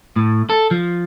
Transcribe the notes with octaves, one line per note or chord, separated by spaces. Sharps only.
A2
A4
F3